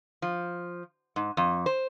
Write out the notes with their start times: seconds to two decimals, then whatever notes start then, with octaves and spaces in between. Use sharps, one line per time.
0.22 F3
1.16 G#2
1.37 F2
1.66 C5